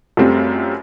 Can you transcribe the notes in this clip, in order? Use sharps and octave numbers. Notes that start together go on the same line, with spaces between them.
F#2 G3 A3 C4 F4